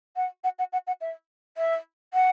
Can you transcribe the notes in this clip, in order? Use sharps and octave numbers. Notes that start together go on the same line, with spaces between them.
F#5
F#5
F#5
F#5
F#5
E5
E5
F#5